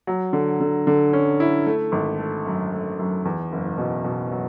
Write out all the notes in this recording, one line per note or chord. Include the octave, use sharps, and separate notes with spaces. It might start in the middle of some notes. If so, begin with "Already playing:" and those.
F#3
D3
D3
D3
C#4
E4
A3
G#1
A3
F#2
A3
F#2
E2
F#1
B2
B2
F#3